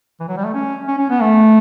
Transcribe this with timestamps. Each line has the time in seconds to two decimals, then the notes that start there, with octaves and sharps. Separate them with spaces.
0.20 E3
0.29 F#3
0.37 G3
0.44 A3
0.54 C#4
0.88 C#4
0.98 C#4
1.10 B3
1.22 A3